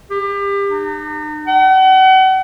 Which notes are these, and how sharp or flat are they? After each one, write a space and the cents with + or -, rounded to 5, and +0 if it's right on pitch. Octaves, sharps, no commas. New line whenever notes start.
G4 +30
D#4 -40
F#5 +40